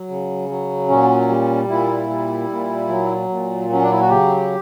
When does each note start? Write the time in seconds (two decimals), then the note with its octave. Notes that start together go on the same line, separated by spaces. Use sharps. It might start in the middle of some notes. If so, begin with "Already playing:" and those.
Already playing: F#3
0.09 C#3
0.49 F#3
0.89 A#2 C#4
1.28 G3
1.68 A#2 E4
2.10 G3
2.49 A#2
2.89 F#3
3.29 A#2
3.69 F#3 C#4
3.82 D4
3.91 E4
4.01 F#4
4.09 C#3 G4